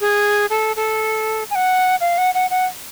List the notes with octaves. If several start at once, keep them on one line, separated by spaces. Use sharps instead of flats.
G#4
A4
A4
G#5
F#5
F5
F#5
F#5
F#5